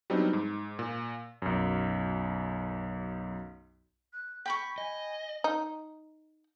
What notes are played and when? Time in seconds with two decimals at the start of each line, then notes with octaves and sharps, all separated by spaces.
0.10 F#3 G3 B3 C4 D4 D#4
0.33 G#2
0.79 A#2
1.42 B1 F#2
4.13 F#6
4.46 G5 B5 C#6 B6
4.78 D#5 G#5
5.44 D#4